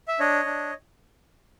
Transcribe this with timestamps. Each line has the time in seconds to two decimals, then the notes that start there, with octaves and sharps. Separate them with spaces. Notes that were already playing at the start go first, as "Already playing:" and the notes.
0.08 E5
0.20 D4 C#5 D#5
0.45 D4